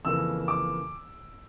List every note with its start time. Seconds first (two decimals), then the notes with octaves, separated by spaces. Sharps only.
0.05 F2 C#3 E3 A#3 E6
0.48 D6